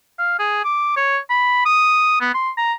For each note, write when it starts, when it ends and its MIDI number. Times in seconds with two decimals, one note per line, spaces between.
0.19 0.35 77
0.39 0.62 68
0.64 0.93 86
0.97 1.18 73
1.30 1.63 83
1.66 2.17 87
2.21 2.32 59
2.35 2.50 84
2.58 2.73 82